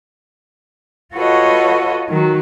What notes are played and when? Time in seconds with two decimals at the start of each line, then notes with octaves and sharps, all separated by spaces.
1.15 F4 F#4 A4 B4 C#5 D#5
2.08 D#3 F#3